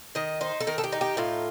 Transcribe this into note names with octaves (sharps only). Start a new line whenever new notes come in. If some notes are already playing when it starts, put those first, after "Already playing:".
D#3 D#5
D#4 C5
A4
D#3 A#4
A4
G4
D#4
G4
A2 F4